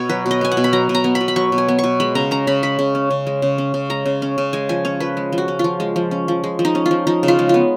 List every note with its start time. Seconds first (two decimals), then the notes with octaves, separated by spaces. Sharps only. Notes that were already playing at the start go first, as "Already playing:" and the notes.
Already playing: B2 B3 C#5
0.09 F#3 B4
0.26 B2
0.31 D#5
0.41 B3 G#5
0.52 F#5
0.57 B2
0.64 B5
0.73 F#3 A#5
0.89 B2
0.95 A#5
1.04 B3
1.15 B5
1.21 B2
1.28 B5
1.36 F#3 C#6
1.52 B2
1.58 G#5
1.68 B3
1.79 C#6
1.84 B2
2.00 G#3 B5
2.15 C#3 A#5
2.31 C#4 A#5
2.47 C#3 B5
2.63 G#3 B5
2.79 C#3
2.95 C#4
3.11 C#3
3.27 G#3
3.42 C#3
3.58 C#4
3.74 C#3
3.90 G#3 A#5
4.06 C#3
4.22 C#4
4.38 C#3
4.53 G#3 G#5
4.69 F3 G#5
4.85 C#4 C#5
5.00 F3 B4
5.17 G#3
5.32 F3
5.38 F#4
5.48 C#4
5.59 F3 F4
5.80 G#3
5.96 F3
6.11 C#4
6.28 F3
6.44 G#3
6.59 F3
6.65 D#4
6.75 C#4
6.86 F4
6.91 F3
7.07 F3 D#4
7.23 C#3
7.28 F4
7.39 G#3
7.49 B3 F4